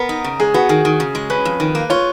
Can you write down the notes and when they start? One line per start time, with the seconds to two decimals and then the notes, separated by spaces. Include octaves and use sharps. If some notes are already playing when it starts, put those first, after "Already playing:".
Already playing: B3 A#4
0.09 D#4
0.24 C#3
0.40 G#3 G#4
0.54 B3 F#4
0.69 D#3 G#4
0.85 D#3
1.00 C#3
1.15 G#3
1.30 C#4 B4
1.45 F2
1.60 D#3
1.75 A#3
1.90 F4 C#5